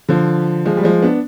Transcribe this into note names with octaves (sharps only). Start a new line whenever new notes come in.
D3 F3
F3 G#3
G3
F3 G#3
B3 D4